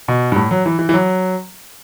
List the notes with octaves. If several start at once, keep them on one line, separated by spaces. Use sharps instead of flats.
B2
G2
A2
F#3
E3
E3
E3
F#3